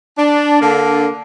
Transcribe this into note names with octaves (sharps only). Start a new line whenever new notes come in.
D4
D3 A#3 D4